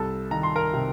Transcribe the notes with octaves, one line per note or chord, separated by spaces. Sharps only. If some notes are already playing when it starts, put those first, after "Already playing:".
Already playing: C2 A4 A5
D#3 A#5
C6
A#4 A#5
C3